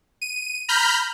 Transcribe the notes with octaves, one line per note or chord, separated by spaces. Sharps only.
D#7
A#5 B5 F6 G6